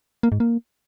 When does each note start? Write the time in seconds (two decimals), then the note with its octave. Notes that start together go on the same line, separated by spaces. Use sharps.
0.23 A#3
0.32 G#2
0.40 A#3